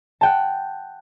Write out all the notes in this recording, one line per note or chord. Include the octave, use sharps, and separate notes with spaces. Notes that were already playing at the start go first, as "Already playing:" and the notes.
F#5 G5 A5